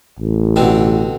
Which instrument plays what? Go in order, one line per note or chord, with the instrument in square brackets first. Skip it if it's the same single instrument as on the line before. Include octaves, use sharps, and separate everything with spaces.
[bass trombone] A1
[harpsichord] B2 D3 C4